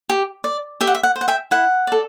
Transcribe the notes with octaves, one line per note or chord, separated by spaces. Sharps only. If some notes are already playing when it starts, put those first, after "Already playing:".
G4
D5
G4 E5
F#5
E5
F#5
C5
F#5
E5 G5
E4 F#5
A4 D5